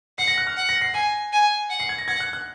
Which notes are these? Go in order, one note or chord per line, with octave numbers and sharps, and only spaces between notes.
F#5 C7
A#6
F#6
F6
F#5
A#6
C7
G#5 C7
G#5
F#5
C7
G#6
A#6
F#5 G#6
F#6
F#6